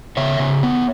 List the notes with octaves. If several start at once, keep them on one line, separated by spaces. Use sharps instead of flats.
C#3 C#5 E5
C#3
B3